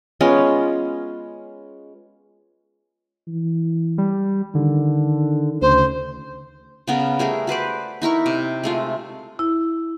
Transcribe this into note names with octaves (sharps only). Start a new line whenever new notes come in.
G#3 B3 C#4 F4
E3
G3
D3 D#3
D2 C#3 C5
C#3 B3 A#4
G3 A3 G#4 A#4
F#4 B4 C5 D5
D#4 E4 A#4 C#6
C3
G#3 A3 F4
E4